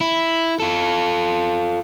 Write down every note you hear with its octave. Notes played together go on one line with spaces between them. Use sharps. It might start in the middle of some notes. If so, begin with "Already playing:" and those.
E4
F4 A4